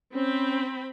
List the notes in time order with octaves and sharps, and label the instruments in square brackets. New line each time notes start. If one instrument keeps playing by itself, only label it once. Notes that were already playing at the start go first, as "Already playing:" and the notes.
[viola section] C4 B5 [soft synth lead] C#4